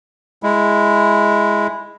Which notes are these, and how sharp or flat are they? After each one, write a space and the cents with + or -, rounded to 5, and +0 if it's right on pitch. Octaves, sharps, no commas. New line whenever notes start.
G#3 +0 E4 +0